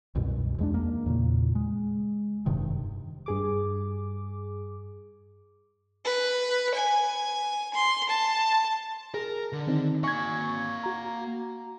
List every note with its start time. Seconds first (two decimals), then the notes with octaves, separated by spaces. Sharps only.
0.15 C2 F#2 B2
0.59 E2 G#3 D4
0.74 A#3
1.06 E2 A#2 C#3
1.55 G#3
2.46 F1 G2 C3 D#3
3.26 G2 G#4 D6
6.05 B4
6.75 G#5
7.74 C6
8.09 A5
9.14 G#4 A#4
9.52 D3
9.67 D#3 C4 D#4
10.04 A#3 G#5 C#6 G#6
10.83 F#4 A#5